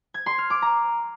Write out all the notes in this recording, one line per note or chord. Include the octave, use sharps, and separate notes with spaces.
G#6
C6
F6
D6
A#5